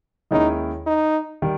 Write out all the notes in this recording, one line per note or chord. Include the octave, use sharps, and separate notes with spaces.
D#2 D#3 G#3 C#4 D#4 E4
D#4
D#3 G3